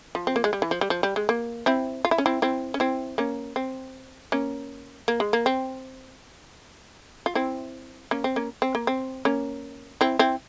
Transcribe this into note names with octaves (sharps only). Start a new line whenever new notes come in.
F3
C4
A#3
G#3
G3
E3
F3
G3
F3
G3
G#3
A#3
C4 E4
F4
E4
C#4
C4 E4
C4 E4
C#4
C4 E4
A#3 C#4
C4
A#3 C#4
A#3
G#3
A#3
C4
F4
C4 E4
A#3 C#4
C4
A#3 C#4
C4
A#3
C4
A#3 C#4
C4 E4
C4 E4